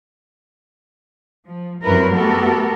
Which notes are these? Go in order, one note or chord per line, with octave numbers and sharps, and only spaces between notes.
F3
F#2 G3 C4 E4 A#4 B4
A3 B3 F#4 G4 A4 A#4